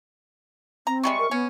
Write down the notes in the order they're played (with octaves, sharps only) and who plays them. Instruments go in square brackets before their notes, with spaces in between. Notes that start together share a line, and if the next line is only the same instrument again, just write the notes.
[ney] C4 [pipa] A#5
[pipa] C3 G3 G#3 [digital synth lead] C#6
[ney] A#4
[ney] B3 [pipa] C#4